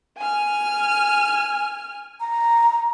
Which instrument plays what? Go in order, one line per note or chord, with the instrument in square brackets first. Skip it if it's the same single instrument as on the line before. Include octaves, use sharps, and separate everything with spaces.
[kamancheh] G#5 F6
[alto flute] A#5